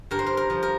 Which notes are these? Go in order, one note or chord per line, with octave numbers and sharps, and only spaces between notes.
G2 A#4
C5
A#4
A#4
F3
A#4